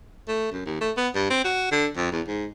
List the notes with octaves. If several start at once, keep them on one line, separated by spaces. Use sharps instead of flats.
A3
F#2
D#2
A3
B3
G2
C4
F#4
D3
F2
E2
G#2